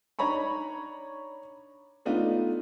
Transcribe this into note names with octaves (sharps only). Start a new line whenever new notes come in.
D4 D#4 C#5 A#5 B5 C#6
A3 B3 D4 D#4 F4